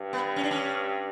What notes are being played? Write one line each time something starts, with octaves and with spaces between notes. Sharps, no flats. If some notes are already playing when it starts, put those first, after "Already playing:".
Already playing: G2
B3
C#4
D4
C#4